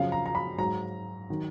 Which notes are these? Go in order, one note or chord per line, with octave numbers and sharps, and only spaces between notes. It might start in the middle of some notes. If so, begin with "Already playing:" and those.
Already playing: F#2 C#3 F3 F5
A#5
A#5
B5
G#2 F#3 A#5
D#3 F#3